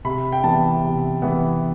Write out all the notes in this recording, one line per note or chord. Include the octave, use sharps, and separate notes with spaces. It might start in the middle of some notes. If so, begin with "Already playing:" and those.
C3 B5
G5
E3 B3 A5
C3
E3 B3